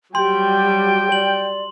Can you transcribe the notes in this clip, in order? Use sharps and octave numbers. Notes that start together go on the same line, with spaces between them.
F#3 G3 G4 G5 C6
D5 F#7